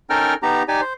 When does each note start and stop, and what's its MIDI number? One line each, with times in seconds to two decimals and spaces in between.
0.10 0.34 61
0.10 0.34 63
0.10 0.34 69
0.10 0.34 70
0.10 0.34 79
0.10 0.34 89
0.43 0.63 59
0.43 0.63 63
0.43 0.63 67
0.43 0.63 82
0.68 0.81 63
0.68 0.81 67
0.68 0.81 74
0.68 0.81 80
0.81 0.93 72